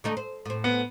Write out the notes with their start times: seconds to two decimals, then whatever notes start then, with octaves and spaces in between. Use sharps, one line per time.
0.04 D3 A3 D#4
0.17 C5
0.46 A2 C4
0.64 B3